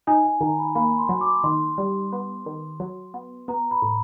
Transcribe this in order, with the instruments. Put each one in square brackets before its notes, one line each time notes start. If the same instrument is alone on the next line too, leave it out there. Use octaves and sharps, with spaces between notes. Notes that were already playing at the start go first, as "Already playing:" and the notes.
[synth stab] D#4 [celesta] G#5
[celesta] G#5
[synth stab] D#3 [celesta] A#5
[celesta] B5
[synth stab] A#3 [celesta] B5
[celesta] C6
[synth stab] F#3
[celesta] D6
[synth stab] D#3 [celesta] C6
[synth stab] G3
B3
D#3
F#3
B3
[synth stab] B3 [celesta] A#5
[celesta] B5
[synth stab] A2